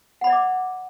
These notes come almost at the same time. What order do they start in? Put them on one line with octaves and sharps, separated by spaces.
F#5 B5 D5 E5 D6